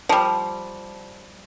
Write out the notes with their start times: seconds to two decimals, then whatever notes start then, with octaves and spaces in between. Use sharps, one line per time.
0.09 F3 G3